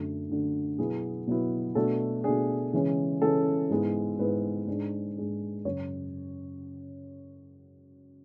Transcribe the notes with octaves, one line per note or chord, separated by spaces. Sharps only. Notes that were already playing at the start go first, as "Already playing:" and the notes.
Already playing: F#2 D3 A3
F#2 D3 A3
B2 F#3 B3 E4 G#4
B2 F#3 B3 E4
B2 A3 D4 A4
B2 A3 D4 G#4
C#3 E3 G#3 C#4
C#3 E3 G#3 C#4 A4
G#2 G#3 B3 E4
G#2 G#3 B3 E4 B4
G#2 G#3 D4
G#2 G#3 D4
F#2 C#3 F#3 C#5